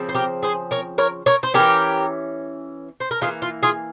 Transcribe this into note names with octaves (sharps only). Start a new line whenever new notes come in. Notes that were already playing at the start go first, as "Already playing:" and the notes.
Already playing: C#3 F3 C4
C5
G4 A#4
G#4 C5
A#4 C#5
A#4 C#5
A#4 C#5
C5
E3 G3 C#4 G4 A#4
C5
A#4
E3 G3 A#3 F4 G#4
F4
F4 G#4